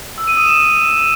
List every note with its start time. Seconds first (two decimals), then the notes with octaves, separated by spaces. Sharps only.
0.18 E6
0.27 D#7
0.37 D#6
0.47 E7